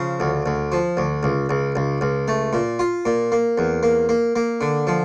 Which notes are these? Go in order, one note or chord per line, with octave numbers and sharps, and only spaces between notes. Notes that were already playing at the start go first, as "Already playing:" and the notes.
Already playing: C#3 F3
D2
D2
F3
D2
C#2
C#2
C#2
C#2
A3
A#2
F4
A#2
A#3
E2
A#3
A#3
A#3
D3
F3